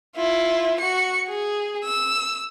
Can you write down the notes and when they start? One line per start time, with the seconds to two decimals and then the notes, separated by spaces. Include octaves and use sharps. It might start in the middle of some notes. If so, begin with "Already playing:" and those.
0.16 E4 F4
0.80 F#4 C#7
1.28 G#4
1.84 E6